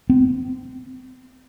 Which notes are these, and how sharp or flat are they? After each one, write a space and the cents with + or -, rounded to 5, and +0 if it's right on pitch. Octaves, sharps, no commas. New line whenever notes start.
C4 -35